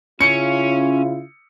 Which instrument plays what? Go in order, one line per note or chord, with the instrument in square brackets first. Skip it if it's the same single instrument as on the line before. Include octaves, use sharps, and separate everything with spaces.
[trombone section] C#3 E4 F4 [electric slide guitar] C#4 [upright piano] C#7